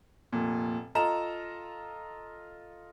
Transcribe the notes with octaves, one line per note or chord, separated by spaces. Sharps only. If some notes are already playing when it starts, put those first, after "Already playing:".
F1 A#2
F4 A4 D#5 A#5 E7